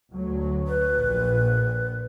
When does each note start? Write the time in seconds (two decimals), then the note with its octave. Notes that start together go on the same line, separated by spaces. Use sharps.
0.13 D2 F#3
0.67 B4
0.99 A#1 A#2